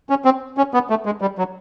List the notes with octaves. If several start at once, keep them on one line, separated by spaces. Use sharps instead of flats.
C#4
C4
C#4
B3
A3
G#3
G3
F#3